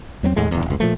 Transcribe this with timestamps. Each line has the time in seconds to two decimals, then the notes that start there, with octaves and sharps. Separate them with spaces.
0.23 E2 F#3 A3 C4
0.36 D#2 A2 G#3
0.51 D1 E2
0.66 F1 C#2
0.80 A#2 F3 A3